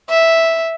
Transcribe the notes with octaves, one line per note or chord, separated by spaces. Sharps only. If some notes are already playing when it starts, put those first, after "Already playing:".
E5